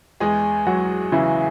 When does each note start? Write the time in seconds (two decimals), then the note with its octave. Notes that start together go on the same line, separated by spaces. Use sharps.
0.20 E2 G#3 G#4
0.67 F#3 F#4
1.12 C#3 E3 E4